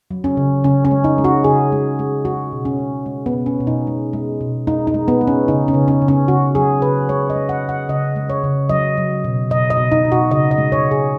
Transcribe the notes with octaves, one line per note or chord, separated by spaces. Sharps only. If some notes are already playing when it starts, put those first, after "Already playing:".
F#3
C#4
C#3
C#3 C#4
C#4
G#3
D#4
G#3
F#4
C#3 G#4
G#3
G#3
G#3 F#4
B2
C#4
G#3
G#3
B3
B2
C#4
B2
D#4
G#3
G#3
B2
G#3 D#4
D#4
G#3
B3
G#3
C#4
C#3 D#4
C#4
C#3
C#4
C#3
C#4
C#3 F#4
F#3 G#4
C#3 B4
G#3 C#5
D#5
G#3
F#5
C#3
F#5
C#3 D#5
G#3
C#5
C#3
F#3 D#5
F#3
B2
B2 D#5
D#5
B2
D#4
B2
F#4
C#3 D#5
D#5
G#3
C#5
C#3
G#4